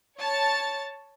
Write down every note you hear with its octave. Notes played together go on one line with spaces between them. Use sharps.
C#5 A5 A6